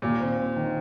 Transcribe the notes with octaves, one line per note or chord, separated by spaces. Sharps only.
D#2 A#2
C4
C4
D#3